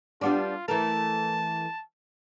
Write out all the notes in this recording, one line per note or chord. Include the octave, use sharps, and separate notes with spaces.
G3 B3 D4 F4
E3 A3 A#4 A5